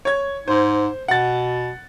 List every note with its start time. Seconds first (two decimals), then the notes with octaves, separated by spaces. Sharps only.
0.05 C#5 G#6
0.48 G#2 C5
1.08 B2 F#5 A6